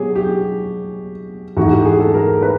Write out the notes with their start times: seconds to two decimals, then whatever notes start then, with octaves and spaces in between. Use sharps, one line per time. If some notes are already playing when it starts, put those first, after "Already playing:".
Already playing: B2 F#3 G4 G#4
0.16 G4
1.57 G#2 E3 A3 F#4
1.71 G4
1.85 G#4
2.00 A4
2.14 A#4
2.42 B4